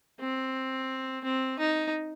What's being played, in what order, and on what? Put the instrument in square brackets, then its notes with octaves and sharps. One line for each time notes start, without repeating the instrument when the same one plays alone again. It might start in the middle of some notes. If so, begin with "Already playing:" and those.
[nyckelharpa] C4
C4
D#4